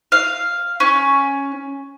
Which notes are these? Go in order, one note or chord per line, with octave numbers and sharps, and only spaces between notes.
F5
C#4